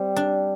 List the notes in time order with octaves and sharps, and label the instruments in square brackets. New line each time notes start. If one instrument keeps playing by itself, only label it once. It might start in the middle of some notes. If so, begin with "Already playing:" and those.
Already playing: [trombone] G3 [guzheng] C4
[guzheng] D4